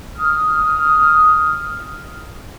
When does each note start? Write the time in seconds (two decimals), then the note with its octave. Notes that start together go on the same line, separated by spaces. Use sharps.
0.16 D#6 F6